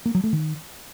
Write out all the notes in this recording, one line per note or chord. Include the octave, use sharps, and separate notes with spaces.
A#3
F#3
A3
D#3